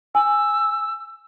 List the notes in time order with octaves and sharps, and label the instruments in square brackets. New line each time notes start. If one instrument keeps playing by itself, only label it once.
[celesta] G#5 [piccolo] E6